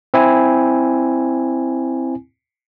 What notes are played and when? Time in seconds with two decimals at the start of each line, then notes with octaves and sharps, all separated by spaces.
0.14 C4 E4 G#5